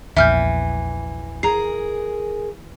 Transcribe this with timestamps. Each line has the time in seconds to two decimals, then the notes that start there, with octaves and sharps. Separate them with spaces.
0.17 A#1 E2 E3 E5 F6 G6
1.43 G#4 A#4 A#5 C7